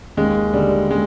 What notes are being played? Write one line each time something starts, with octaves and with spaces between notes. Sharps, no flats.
D#2 G#3
D3 G3
G#3